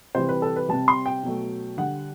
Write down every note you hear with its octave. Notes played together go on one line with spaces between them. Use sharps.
C3 E3 G3 C5
B4
A4
B4
C3 G3 A5
C6
G5
B2 F#3 A3
D3 G3 F#5